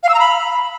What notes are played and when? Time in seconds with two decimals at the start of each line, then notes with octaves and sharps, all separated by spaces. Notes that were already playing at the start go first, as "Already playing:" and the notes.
0.03 F5
0.09 E6
0.14 A#5
0.20 B5